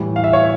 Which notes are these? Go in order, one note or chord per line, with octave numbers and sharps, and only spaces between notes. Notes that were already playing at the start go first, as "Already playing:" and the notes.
Already playing: A2 E3 G3
F5
E5
C#5